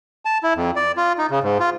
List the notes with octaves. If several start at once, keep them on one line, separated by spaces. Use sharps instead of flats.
A5
E4
F2
D5
F4
D#4
C#3
G#2
F4